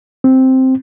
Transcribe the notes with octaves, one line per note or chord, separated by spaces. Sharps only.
C4